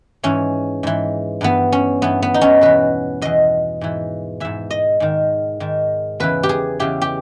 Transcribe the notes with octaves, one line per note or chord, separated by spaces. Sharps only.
G#2 E3 C#4
G#2 E3
G2 E3 B3
C#4
G2 E3 B3
B3
D#4
C#4
E2 B2 B4
E2 B2 D#5
G#2 E3
G#2 E3 E5
D#5
G#2 D#3
G#2 D#3
E2 C#3 E3 B4
G4
G#4
E2 C#3 E3 G4
G4